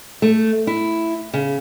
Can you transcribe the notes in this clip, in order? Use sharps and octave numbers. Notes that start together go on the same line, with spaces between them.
A3
E4
C#3